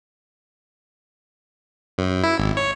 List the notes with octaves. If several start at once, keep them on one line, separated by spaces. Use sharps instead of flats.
F#2
E4
G#1
C#5